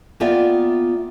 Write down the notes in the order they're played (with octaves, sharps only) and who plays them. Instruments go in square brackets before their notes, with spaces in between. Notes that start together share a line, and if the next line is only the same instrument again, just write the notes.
[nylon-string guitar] A#3 B3 F4 D5 E5 G5